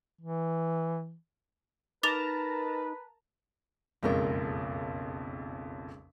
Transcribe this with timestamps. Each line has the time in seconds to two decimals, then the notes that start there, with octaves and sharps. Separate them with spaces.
0.21 E3
2.03 D#4 A#4 B4 A5 A#5 D6 A6 F7
4.03 F#1 B1 F2 G#3 C#4 A#4